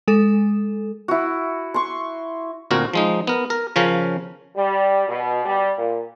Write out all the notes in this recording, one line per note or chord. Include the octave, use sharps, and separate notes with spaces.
G#3 A4
E4 F#4
C6 C#6
D2 A#2 C4 F#4 A#4
F3 G#3 D#4
B3 A#4
A#4
C#3 F3 C#4 A#4
G3
B2
G3
A#2